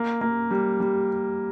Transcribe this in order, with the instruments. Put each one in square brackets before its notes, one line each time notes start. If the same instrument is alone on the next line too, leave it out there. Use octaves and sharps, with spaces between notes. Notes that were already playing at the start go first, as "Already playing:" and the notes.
Already playing: [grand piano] A#3
A#3
G3
G3